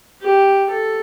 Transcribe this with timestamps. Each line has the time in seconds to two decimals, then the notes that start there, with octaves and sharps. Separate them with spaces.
0.22 G4
0.69 A4